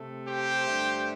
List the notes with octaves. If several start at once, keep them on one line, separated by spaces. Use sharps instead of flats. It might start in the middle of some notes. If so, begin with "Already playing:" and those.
Already playing: C3 A3
G4 C5
G2 D3 A3